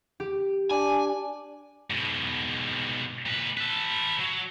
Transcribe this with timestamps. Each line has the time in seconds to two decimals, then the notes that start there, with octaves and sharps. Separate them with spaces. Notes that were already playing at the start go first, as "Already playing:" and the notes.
0.20 G4
0.71 D4 D5 G#5
1.90 G#2 B2
3.26 A#2 B4
3.57 A4 B4
4.20 F#3